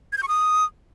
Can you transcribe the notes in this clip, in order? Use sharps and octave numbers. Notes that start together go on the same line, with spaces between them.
G#6
G6
C#6
D#6